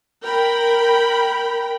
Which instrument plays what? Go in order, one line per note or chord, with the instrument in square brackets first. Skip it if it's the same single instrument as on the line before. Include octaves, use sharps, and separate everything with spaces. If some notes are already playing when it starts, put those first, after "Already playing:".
[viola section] A#4 G5 B5